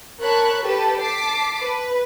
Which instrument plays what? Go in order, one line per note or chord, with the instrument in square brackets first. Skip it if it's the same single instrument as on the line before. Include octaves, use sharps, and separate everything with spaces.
[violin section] A#4 C#5 A5 B5 C#6 F#6
G4 A4 B4 A5
A5 D6 B6 C7
B4